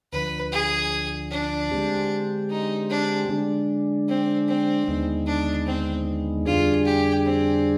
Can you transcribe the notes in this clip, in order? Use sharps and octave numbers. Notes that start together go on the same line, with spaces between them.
D2 D3 F3 B4
G#4
D4
D3 G#3 C4 G4
D#4
D4
D3 G#3 D4
C4
C4
D#2 D3 G#3 B3 D#4
D4
C4
F2 D3 G3 D4 F4 G#4
G4
C4